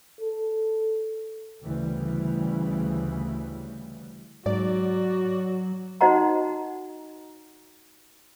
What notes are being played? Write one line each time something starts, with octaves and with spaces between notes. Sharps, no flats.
A4
D2 C#3 E3 G3
G#2 F#3 F#4 D5
D#4 F#4 C5 D#5 F#5 A#5